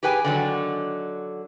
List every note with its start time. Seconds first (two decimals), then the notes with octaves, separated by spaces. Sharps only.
0.03 G4 G#4 B4 G5 G#5
0.24 D3 D#3 F#3